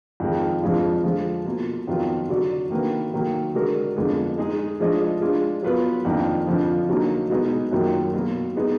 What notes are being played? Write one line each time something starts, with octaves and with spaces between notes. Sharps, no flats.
F2 D#3 G#3
F2 F3 G#3 D4 F4
D3 F3 G#3
B2 A#3 F4
F2 D#3 F#3 B3 F4
D3 F#3 D4 F#4 D5
D#3 A#3 D4 F#4 B4
D#3 F#3 A#3
D3 G#3 D4 F#4 A#4
F2 D3 G#3 B3
G#3 D#4 G#4
F3 G#3 D4 G#4 D#5
G#3 D4 F4
F#3 B3 F4 B4
F2 D#3 A#3 D4
F2 D3 F3
D3 F#3 A#3 D#4
B2 G#3 B3 D#4 G#4
F#2 D#3 F#3 A#3 F4
B2 F#3 A#3
G#3 B3 D#4 G#4